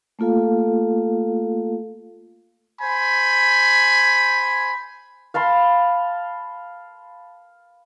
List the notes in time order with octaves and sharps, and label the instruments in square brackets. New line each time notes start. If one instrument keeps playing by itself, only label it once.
[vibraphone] A3 A#3 F4 A4 F5
[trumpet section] C5 G#5 B5
[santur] F5 A5 B5 C6